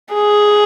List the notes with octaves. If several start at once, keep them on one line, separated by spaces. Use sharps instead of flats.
G#4